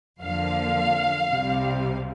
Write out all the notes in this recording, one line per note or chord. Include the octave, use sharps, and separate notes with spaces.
F2 D3 F3 A#3 F5
C2 C3 G3 C4